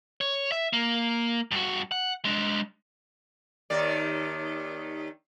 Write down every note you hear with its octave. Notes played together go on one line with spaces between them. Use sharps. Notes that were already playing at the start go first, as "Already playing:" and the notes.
C#5
E5
A#3
G2 F#4
F#5
G#3 D4
D#2 D#3 D5